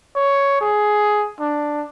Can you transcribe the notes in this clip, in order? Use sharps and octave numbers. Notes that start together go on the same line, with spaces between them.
C#5
G#4
D4